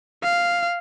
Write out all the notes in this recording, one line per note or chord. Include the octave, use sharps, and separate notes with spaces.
F5